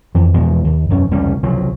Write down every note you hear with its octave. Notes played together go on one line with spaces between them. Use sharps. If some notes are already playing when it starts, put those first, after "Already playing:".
F2 E3
E2 B2 F3 G#3
D#2
E1 F#2 C#4
F1 C#2 G3 C#4
C2 C#3 F3 F#3